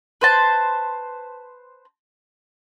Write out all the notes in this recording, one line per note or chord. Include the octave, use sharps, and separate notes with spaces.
B4 C5 A5